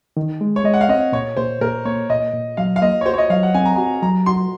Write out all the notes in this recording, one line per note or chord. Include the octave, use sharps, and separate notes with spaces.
D#3
G#3
C#5
G#3 D#5
F#5
F5
C4 D#5
A#2 C#5
A#2 C5
A#2 A#4
A#3 C#5
A#2 D#5
A#2
F#3 F5
F5
A#3 D#5
C#5
F#4 C5
C#5
D#5
F#3 F5
F#5
C4 G#5
A#5
F#4 G#5
F#3 A#5
F#4 C6